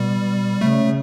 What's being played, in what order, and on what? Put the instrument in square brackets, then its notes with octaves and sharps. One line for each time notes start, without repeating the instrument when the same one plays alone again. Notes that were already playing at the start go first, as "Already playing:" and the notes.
Already playing: [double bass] B2 [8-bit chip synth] G3
[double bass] C#3 [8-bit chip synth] A3